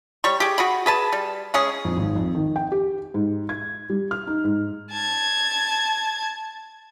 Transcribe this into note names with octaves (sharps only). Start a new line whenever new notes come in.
G3 C#5 C#6
G4 G#4
F#4 G#4 B5
G#4 B4 A5
G3
G#3 C#4 G#4
F2
G#1
F2
D#3
G5
G4
G#2
G#6
G3
F6
D#4
G#2
A5 G#6